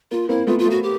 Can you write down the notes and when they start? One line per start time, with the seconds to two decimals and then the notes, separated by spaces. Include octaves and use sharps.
0.11 A#3 F4
0.29 A#3 C4 E4
0.47 A3 B3 F4
0.59 F4
0.65 A3
0.71 F#4
0.83 G4